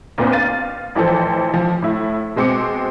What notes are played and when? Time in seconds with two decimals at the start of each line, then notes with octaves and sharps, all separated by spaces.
0.18 D#2 A#2 B3 C4 D4
0.32 F5 A6 D#7
0.95 A1 E3 F3 A4 C5
1.54 F3
1.82 A2 E4
2.36 B2 G#3 C4 D6 C#7